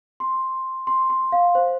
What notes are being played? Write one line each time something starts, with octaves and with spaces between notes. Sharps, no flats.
C6
C6
C6
F5
C5